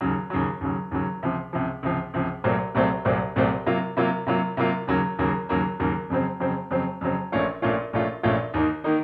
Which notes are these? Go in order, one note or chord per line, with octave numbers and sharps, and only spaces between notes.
D#2 C#3 F#3
D#2 C#3 F#3
D#2 C#3 F#3
D#2 C#3 F#3
C#2 C3 F3
C#2 C3 F3
C#2 C3 F3
C#2 C3 F3
C2 A#2 F#3 A3 C4
C2 A#2 F#3 A3 C4
C2 A#2 F#3 A3 C4
C2 A#2 F#3 A3 C4
C3 F#3 A#3 F4
C3 F#3 A#3 F4
C3 F#3 A#3 F4
C3 F#3 A#3 F4
D#2 C#3 F#3 A#3
D#2 C#3 F#3 A#3
D#2 C#3 F#3 A#3
D#2 C#3 F#3 A#3
F2 C#3 F#3 C4
F2 C#3 F#3 C4
F2 C#3 F#3 C4
F2 C#3 F#3 C4
A#1 A#2 A3 C#4 F4
A#1 A#2 A3 C#4 F4
A#1 A#2 A3 C#4 F4
A#1 A#2 A3 C#4 F4
D#2 D#3 A#3 D#4
D#3 A#3 D#4